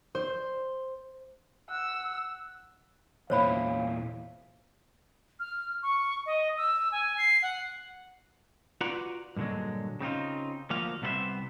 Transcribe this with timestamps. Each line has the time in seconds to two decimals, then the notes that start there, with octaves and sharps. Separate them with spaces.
0.15 C5
1.70 F#5 E6
3.30 E2 A#2 E4 C5 C#5 F5 B5
5.40 F6
5.82 C#6
6.26 D#5
6.58 E6
6.92 G#5
7.18 C7
7.42 F#5
8.81 F4 F#4 B4 D5 F#5 A#5
9.36 G2 A#2 D3 F#3 G#3
10.00 C#3 C4 D#4 F4
10.70 D2 F3 A#3 F#4 F5
11.02 C2 C3 B3 A4 C5 E5